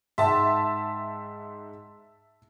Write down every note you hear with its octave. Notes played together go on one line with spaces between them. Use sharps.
G#2 E5 F#5 G5 A5 C6